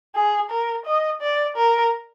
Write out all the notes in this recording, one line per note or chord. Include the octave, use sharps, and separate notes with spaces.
G#4
A#4
D#5
D5
A#4